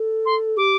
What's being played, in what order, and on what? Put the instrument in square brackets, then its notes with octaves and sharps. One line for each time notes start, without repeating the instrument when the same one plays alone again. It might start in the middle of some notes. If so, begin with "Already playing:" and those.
Already playing: [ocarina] A4
[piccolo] C6
[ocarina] G4 [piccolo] D6